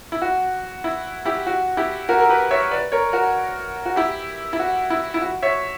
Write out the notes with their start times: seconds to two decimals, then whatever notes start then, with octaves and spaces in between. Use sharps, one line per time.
0.12 E4
0.22 F#4
0.84 E4
1.25 E4 G4
1.47 F#4
1.77 E4 G4
2.09 F#4 A#4
2.20 A#4
2.29 G4 B4
2.51 C#5 E5
2.71 B4 D5
2.92 A#4 C#5
3.13 F#4 A#4
3.86 F#4
3.96 E4 G4
4.53 E4
4.59 F#4
4.90 E4
5.14 E4
5.22 F#4
5.42 C#5 E5